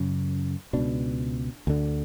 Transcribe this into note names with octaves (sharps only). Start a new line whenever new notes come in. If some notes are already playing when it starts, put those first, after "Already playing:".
Already playing: F#2 C#3
C#2 B2 D4
D2 D3